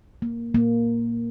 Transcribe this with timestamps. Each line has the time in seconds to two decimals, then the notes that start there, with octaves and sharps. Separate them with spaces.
0.22 A#3
0.54 A#2 A#3